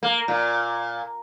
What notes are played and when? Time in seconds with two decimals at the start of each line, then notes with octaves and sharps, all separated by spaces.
0.03 A#3
0.28 A#2